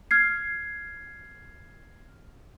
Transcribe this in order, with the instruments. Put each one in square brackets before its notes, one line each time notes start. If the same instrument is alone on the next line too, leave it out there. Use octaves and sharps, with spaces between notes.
[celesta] F6 G#6 C7